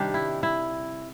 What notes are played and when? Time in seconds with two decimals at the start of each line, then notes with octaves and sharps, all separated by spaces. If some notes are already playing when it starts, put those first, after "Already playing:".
Already playing: C3 D#3 G3 D4
0.14 E4
0.43 E4